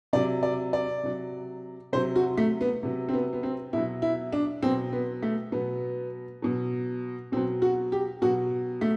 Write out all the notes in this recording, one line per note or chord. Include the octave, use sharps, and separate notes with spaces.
C3 F#3 D5
D5
D5
C3 F#3
C3 F#3 C5
F#4
A3
B3
C3 F#3
C4
B3
B3
C4
B2 F#3 E4
E4
D4
B2 F#3 C4
B3
A3
B2 F#3 B3
B2 F#3
B2 F#3 C4
F#4
G4
B2 F#3 F#4
A3